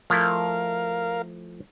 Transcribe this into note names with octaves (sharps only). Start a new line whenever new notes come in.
F3 A3 E4 A#4 F5